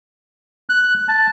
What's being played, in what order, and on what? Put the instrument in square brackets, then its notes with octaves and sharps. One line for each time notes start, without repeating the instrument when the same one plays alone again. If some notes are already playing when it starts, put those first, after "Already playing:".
[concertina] F#6
A5